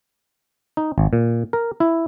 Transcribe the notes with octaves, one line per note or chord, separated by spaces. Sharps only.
D#4
G#1
A#2
A#4
E4